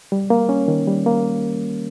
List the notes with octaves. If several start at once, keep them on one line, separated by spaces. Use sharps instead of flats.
G3
A#3
C#4
D#3
G3
A#3